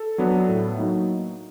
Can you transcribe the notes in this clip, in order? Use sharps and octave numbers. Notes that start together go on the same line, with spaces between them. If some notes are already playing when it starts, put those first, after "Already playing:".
Already playing: A4
F#3 B3 D4
A2
F#3 A#3 D#4